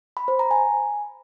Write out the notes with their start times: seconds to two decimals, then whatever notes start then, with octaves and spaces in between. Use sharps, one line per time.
0.17 B5
0.28 C5
0.39 A#5
0.51 G#5